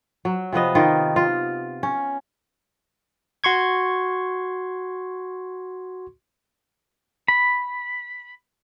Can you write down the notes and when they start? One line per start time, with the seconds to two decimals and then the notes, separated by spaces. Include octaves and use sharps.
0.25 F#3
0.53 C3 F3 B3 D#5
0.75 D#3 F4
1.16 F4
1.83 C#4
3.44 F#4 C6 C#6 G#6
7.28 B5